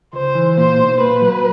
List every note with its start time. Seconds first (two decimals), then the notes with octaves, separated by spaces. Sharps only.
0.13 C#2 C5
0.35 E3
0.57 A#2 C5
0.78 B1
1.00 A#2 B4
1.22 F#3